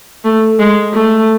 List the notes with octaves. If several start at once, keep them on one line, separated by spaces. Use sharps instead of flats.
A3
G#3
A3